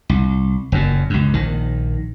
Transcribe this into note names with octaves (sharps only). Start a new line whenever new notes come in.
C2
F#1 F#2 A#2
C#2 F#2
A#1 D#3